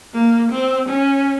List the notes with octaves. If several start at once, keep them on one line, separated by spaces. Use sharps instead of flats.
A#3
C4
C#4